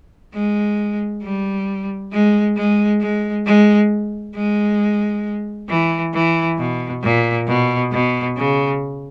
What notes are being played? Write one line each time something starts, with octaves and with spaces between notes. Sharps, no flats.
G#3
G3
G#3
G#3
G#3
G#3
G#3
E3
E3
B2
A#2
B2
B2
C#3